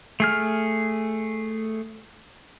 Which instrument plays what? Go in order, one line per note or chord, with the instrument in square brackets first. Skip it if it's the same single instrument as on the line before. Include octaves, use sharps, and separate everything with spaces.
[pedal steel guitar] A3 G#4 F6